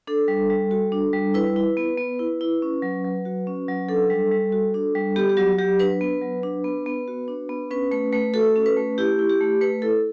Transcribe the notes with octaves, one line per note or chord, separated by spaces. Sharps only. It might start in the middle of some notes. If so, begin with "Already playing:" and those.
D4 A4
G3
G3
F#4
D4
G3
E4 B4
E4
B3
B3
E4
E4
C#4
F#3
F#3
F#4
C#4
F#3
D4 A4
G3
G3
F#4
D4
G3
B3 G4
G4
F#3 F#4
F#3 G4
D4 B4
B3
F#3
D4
B3
B3
F#4
D4
B3
C#4 B4
A3 B4
A3 B4
F#4 A4
C#4
B4
A3
E4 G4
E4
G4
A3
A3 B4
E4 A4